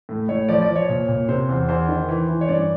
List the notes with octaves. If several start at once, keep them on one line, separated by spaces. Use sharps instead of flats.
A2
A2 C#5
F3 D5
D5
F3
C#5
A#2
A#2
C3 C5
E2
E2 C5
D#3
E3
E3
C#5
G2 D5